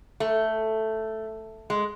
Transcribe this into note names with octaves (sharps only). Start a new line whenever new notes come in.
A3
G#3